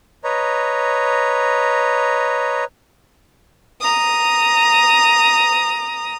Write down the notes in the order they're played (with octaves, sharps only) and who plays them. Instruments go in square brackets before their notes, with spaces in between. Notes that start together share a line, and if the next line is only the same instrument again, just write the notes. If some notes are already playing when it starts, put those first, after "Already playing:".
[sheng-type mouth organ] B4 C#5 D#5 A#5
[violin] A#5 D#6